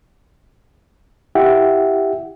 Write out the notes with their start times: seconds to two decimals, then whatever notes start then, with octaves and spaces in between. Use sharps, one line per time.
1.35 E4 G4 E5 F#5 G5